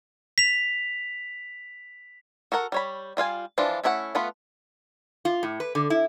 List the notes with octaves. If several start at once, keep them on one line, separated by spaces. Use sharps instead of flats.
B6 F7
F#4 A4 A#4 F#5
G3 C#5 B5
G3 F4 F5 G#5
E3 F3 D4 F4
A3 C#4 E4 C#5 F#5
A3 B3 F4 B4
F4
A2
B4
D3
E4